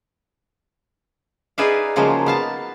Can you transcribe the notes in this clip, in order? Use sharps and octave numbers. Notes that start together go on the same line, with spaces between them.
D#4 G#4 B4 D5 E5 F5
C#3 F3 F#3 G#3 A#3
B3 F5 A5